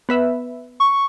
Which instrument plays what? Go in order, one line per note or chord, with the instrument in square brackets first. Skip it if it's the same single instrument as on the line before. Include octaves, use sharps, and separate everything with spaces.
[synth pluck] B3 B4 E5
[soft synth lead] C#6